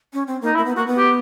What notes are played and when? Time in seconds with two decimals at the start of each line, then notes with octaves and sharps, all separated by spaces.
0.13 C#4
0.27 C4
0.42 A#3 D#4
0.55 A#3 E4
0.65 B3
0.76 A#3 F#4
0.87 B3
0.97 G4